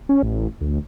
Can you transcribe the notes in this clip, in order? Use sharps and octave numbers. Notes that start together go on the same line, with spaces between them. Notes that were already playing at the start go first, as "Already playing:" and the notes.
C#4
A1
D2